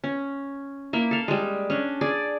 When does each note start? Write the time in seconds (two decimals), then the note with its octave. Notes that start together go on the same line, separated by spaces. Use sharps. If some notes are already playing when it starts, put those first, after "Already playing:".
0.04 C#4
0.93 A#3 E4
1.11 A4 F5
1.28 G3 G#3
1.70 C#4 D4
2.01 G#4 D5